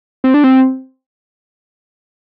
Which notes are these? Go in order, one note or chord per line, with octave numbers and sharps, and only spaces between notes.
C4
D4
C4